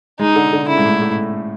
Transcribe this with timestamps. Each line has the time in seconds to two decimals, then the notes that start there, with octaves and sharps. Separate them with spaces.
0.19 G#3 D#4
0.36 D3
0.53 D3
0.69 C#3 E4
0.78 G#2
0.85 A2
1.02 A2